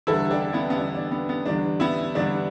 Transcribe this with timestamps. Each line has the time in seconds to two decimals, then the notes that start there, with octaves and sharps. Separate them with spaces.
0.07 E2 D3 G3 E4 A4
0.31 D4 G4
0.53 B3 E4
0.70 B3
0.77 E2 D3 G3 D4
0.95 D4
1.11 B3
1.29 B3
1.46 E2 D3 G3 D4
1.80 B3 E4
2.15 E2 D3 G3 D4